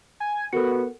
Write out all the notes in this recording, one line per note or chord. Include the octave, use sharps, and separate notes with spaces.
G#5
B3 F#4 A4 A#4 C#7